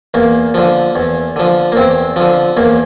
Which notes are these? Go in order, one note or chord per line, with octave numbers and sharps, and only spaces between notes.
E2 A#3
D3 F3
E2
D3 F3
A#3
E2 C4
D3 F3
E2 A#3